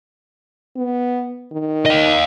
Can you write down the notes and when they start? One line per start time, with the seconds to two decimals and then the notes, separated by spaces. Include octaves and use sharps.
0.76 B3
1.52 D#3
1.86 D#5 F5